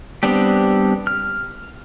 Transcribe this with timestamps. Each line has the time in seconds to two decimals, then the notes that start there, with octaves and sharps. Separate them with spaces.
0.23 G3 B3 C4 D4 G4
1.07 F6